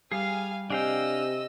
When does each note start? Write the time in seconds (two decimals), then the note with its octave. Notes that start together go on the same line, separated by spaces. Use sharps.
0.12 G3 G#4 F5 G#5
0.70 C3 D4 D#5 F5 G5 G#5 E6